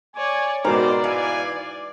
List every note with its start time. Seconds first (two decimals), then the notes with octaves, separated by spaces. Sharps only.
0.16 C#5 D5 G#5
0.65 G#2 B2 C4 A#4 C5 D5 D6
1.04 E3 F5 G#5